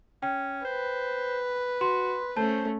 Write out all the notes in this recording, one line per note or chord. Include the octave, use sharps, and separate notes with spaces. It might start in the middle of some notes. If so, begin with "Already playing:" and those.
C#4 G5
B4 C5
F#4 C6
A3 C#4 C5 A5